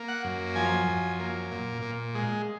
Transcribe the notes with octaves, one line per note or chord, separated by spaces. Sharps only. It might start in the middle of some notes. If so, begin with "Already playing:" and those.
Already playing: A#3
F#5
F#2
F3 G#5
F#2
A#3
A#2
A#2
G#3